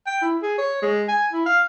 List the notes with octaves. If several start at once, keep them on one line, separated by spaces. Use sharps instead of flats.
G5
E4
G#4
C#5
G#3
G#5
E4
F5